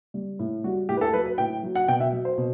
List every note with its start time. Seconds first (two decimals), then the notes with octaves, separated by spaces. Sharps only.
0.14 G3
0.39 A2
0.64 G3 F#4
0.89 A2 G4
0.97 B4
1.01 A4
1.14 F#3 B4
1.26 B4
1.38 A2 G5
1.63 F#3
1.75 F#5
1.88 B2 G5
2.00 E5
2.13 F#3
2.25 C5
2.37 B2